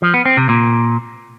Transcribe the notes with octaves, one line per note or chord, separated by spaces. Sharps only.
F3
B3
C4
C3
A#2